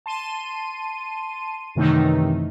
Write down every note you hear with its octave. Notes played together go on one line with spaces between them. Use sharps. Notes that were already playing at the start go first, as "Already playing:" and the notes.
A5 C6 D#7
F#2 C3 D#3 E3 A3 D#4